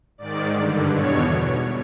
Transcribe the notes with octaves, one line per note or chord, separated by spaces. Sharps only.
G#2 D#3 D5
G2 D3
E2 B2 C#5